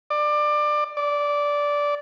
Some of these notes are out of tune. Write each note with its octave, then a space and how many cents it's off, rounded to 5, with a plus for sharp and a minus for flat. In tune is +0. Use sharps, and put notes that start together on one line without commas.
D5 +25
D5 -10